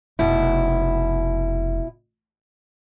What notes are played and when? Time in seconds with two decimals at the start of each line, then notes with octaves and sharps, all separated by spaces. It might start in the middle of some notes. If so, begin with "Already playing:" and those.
0.19 F1 B2 E4